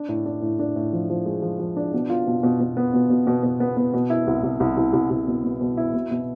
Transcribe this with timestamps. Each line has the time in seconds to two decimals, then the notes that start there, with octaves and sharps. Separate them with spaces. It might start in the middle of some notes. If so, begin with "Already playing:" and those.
Already playing: D4
0.09 A2
0.26 D4
0.42 A2
0.59 D4
0.76 A2
0.93 F3
1.10 F3
1.26 G#3
1.42 F3
1.59 F3
1.77 D4
1.94 B2
2.10 F4
2.27 B2
2.43 B2
2.60 B2
2.77 B3
2.93 B2
3.10 B2
3.27 B2
3.43 B2
3.60 B3
3.77 B3
3.94 B2
4.10 E4
4.27 C2
4.43 C2
4.60 C2
4.77 C2
4.93 C2
5.10 C2
5.27 B2
5.44 B2
5.61 B2
5.77 E4
5.94 B2
6.11 B2